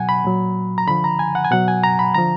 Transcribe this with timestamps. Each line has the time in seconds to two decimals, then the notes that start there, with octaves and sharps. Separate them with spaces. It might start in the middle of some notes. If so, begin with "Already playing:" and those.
Already playing: B2 F#3 F#5 G#5
0.09 B5
0.24 A#2 F#3
0.78 A#5
0.87 D3 F3 B5
1.04 A#5
1.19 G#5
1.35 F#5
1.45 G#5
1.51 B2 F#3 F#5
1.68 G#5
1.84 A#5
1.99 B5
2.15 D3 F3 A#5